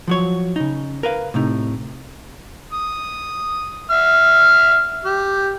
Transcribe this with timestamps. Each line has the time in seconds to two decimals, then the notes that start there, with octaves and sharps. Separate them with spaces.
0.08 F3 F#3 C#5
0.56 C#3 D#4
1.03 A#4 B4 F5
1.34 A2 C3 D#4
2.73 D#6
3.91 E5 F6
5.05 G4